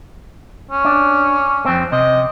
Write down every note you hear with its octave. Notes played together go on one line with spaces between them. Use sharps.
C#4
D4
F2 C4
C3 D#5